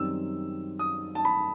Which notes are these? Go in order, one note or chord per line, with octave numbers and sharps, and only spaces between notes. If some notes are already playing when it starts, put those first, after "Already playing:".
Already playing: F#2 D#3 G3 C4 E6
D#6
A5
B5